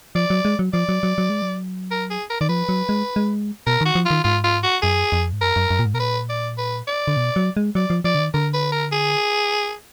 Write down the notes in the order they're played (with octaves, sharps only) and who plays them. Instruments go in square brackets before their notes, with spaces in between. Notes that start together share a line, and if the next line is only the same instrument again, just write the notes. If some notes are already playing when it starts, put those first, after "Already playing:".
[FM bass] F3 [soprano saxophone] D5
[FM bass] F#3
G#3
F#3
[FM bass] F3 [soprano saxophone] D5
[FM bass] F#3
F#3
F#3
G#3
F#3
[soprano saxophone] A#4
G#4
A#4
[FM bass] D#3 [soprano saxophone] D5
[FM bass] F3 [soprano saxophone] B4
[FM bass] F#3
G#3
G#3
[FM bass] B2 [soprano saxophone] A#4
[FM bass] D#3 [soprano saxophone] F#4
[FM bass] F3
[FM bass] D#3 [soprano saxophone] F4
[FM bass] G#2 [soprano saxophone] F4
[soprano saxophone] F4
F#4
[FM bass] F#2 [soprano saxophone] G#4
[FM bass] F2
G#2
[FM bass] F#2 [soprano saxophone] A#4
[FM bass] F#2
F#2
A#2
G#2
[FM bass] B2 [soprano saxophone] A#4
[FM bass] A#2 [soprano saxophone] B4
[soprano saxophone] D5
B4
D5
[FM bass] D3
B2
F#3
G#3
[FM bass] F#3 [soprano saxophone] D5
[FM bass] F3
[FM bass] F3 [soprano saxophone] D5
[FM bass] D3
D#3
[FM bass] D3 [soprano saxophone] A#4
[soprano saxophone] B4
A#4
G#4